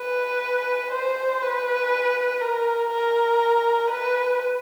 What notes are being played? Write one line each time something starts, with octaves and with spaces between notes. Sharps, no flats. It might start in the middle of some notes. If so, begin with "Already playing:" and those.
Already playing: B4
C5
B4
A#4
A#4
B4